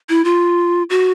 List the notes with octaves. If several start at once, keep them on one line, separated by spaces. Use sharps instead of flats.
E4
F4
F#4